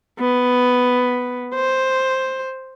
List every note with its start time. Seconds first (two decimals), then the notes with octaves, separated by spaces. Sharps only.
0.19 B3
1.55 C5